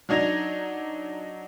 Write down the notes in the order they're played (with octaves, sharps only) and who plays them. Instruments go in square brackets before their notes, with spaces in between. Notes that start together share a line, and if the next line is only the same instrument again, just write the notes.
[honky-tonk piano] F#3 D4 D#4 G#6 A#6 F7